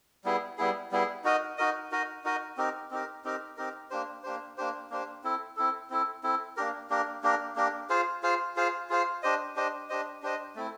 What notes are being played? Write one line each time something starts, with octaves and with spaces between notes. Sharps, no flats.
G3 B3 E4 G#4
G3 B3 E4 G#4
G3 B3 E4 G#4
D#4 F#4 A#4 D#5
D#4 F#4 A#4 D#5
D#4 F#4 A#4 D#5
D#4 F#4 A#4 D#5
C4 D#4 G4 A#4
C4 D#4 G4 A#4
C4 D#4 G4 A#4
C4 D#4 G4 A#4
A#3 D4 G4 C5
A#3 D4 G4 C5
A#3 D4 G4 C5
A#3 D4 G4 C5
C4 E4 A4
C4 E4 A4
C4 E4 A4
C4 E4 A4
A#3 D4 G4 A#4
A#3 D4 G4 A#4
A#3 D4 G4 A#4
A#3 D4 G4 A#4
F4 G#4 C5 F5
F4 G#4 C5 F5
F4 G#4 C5 F5
F4 G#4 C5 F5
D4 G4 C5 D#5
D4 G4 C5 D#5
D4 G4 C5 D#5
D4 G4 C5 D#5
A3 C4 E4